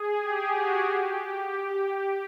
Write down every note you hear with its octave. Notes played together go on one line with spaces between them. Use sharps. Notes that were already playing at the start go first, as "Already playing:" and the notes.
Already playing: G#4
G4
F#4
G4